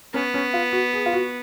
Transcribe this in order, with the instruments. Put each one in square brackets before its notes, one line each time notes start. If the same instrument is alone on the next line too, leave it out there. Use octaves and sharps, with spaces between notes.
[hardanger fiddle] B3 [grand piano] C#4
[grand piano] C#4
F4
F#4
G#4
F4
F#4